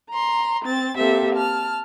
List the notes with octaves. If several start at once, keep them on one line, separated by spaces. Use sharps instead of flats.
A#5 C6
C4 A6
A#3 C4 G4 A4 E5
A5 F6